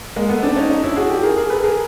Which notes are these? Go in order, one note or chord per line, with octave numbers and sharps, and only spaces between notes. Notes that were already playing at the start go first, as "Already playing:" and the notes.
G#3 A#3
A3 B3
C4 D4
C#4 D#4
C#4 D#4
D4 E4
F#4 G#4
G4 A4
G#4 A#4
G#4 A#4
A4 B4
G#4 A#4